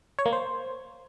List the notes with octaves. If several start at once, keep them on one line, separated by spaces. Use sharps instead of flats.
C#5
A#3
C5